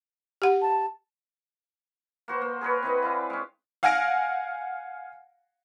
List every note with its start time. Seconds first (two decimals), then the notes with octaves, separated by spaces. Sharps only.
0.42 G4 F#5
0.62 A5
2.28 A#3 F#4 C5
2.42 A#3
2.61 G#4 A#4 B4 C#5
2.83 C4 E4 B4 D#5
3.02 E4 D5 F5
3.30 G#3 C#4
3.83 F5 F#5 G#5 F6 A#6 D7